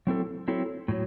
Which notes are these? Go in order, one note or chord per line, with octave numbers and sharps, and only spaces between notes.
F#3 C4 E4 A4
F#3 C4 E4 A4
A2 F#3